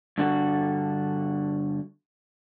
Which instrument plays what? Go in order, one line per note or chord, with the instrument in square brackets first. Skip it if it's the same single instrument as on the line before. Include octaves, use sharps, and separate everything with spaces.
[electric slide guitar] G2 D3 F#4 A4